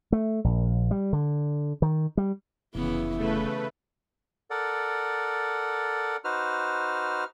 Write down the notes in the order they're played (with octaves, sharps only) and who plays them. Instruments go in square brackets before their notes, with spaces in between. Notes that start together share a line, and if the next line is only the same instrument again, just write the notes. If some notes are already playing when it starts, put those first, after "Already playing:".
[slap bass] A3
A#1
G3
D3
D#3
G3
[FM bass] F1 [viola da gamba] C#3 E3 B3 [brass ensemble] E4
[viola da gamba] C#3 [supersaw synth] A3 B4
[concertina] A4 A#4 D5 F#5
D#4 F#4 B4 C5 F6